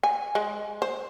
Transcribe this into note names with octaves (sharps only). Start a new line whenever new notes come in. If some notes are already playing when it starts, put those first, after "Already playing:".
G#5
G#3
C5